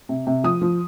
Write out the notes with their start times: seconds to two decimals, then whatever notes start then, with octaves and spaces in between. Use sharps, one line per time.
0.09 C3
0.27 C3
0.44 F3 D#6
0.62 F3